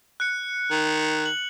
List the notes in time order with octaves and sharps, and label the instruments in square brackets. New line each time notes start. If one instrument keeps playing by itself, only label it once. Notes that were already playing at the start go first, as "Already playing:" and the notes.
[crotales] F#6 C#7
[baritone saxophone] D#3
[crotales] F#7